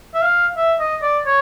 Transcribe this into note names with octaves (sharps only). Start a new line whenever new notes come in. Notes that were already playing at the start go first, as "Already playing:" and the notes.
E5
F5
E5
D#5
D5
C#5